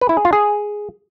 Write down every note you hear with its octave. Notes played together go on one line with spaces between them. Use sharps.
B4
E4
G#4
F4
G#4